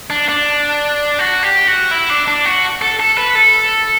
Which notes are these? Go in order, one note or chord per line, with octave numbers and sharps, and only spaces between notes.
D4
D4
F#4
G4
F#4
E4
D4
D4
F#4
A4
A4
B4
A4